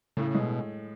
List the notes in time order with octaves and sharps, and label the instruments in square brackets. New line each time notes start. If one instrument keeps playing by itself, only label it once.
[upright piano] A2 [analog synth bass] C#3
[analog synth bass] B2 [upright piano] G#3